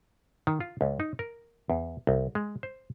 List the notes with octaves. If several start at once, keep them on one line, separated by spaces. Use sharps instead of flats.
D#3
F4
C#2
D#4
A#4
E2
C2
G#3
C5